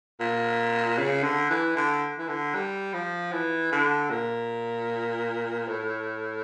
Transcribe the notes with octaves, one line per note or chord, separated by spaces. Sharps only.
A#2
C#3
D3
E3
D3
E3
D3
G3
F3
E3
D3
A#2
A2